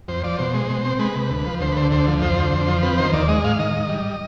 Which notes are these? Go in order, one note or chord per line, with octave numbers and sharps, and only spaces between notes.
F2 C5
F3 D5
B2 C5
G#3
B2
C4
G#3 B4
C3
D2
F3
D2 C5
B4
D3 C5
D2 C5
F3
F2 C5
D3
F2
F3
C4 B4
D#3 C5
D#2 D5
G#3 D#5
G#2 F5
D#3 D#5
G#2
G3